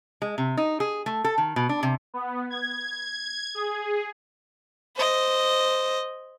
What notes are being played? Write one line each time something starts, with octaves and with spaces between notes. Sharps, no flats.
G#3
C3
D#4
G#4
A3
A4
D#3
B2
D4
C3
B3
G#6
G#4
C5 D#5